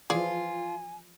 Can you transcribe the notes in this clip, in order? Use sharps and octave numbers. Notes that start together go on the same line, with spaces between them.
E3 F3 F4 G#4 D5 G#5